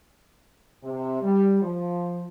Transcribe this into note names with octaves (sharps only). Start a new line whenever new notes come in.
C3
G3
F3